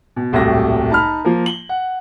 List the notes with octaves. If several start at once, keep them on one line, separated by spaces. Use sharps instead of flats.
B2
D#1 C2 A2 F#3 G4 A#6
D#4 A5 B5 F6
F3 A#3
F#7 G7
F#5